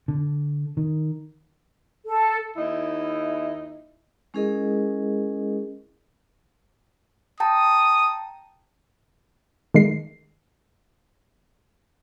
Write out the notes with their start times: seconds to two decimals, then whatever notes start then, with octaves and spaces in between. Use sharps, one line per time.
0.08 D3
0.77 D#3
2.06 A4
2.57 D#2 D#4 E4
4.34 G#3 C#4 E4 G#4 A#4 D#5
7.40 G5 A5 A#5 D#6
9.74 D#3 G#3 C7